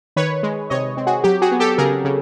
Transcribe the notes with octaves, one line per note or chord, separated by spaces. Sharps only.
D#3 B4 C#5
G#3
C3 C#5 D#5
C4
F#4 G#4
F#3 G4
F#4 G#4
B3
G4 A4
C#3 G#4 A#4
C#3